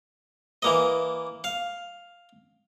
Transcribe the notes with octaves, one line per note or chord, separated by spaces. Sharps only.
E3 A#3 D#5
F5